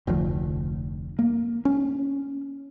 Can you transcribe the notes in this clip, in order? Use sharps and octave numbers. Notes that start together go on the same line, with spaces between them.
F1 D2 F3
A#3
C#4